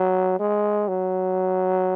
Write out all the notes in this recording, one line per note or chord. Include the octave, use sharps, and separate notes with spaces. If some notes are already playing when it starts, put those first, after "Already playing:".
Already playing: F#3
G#3
F#3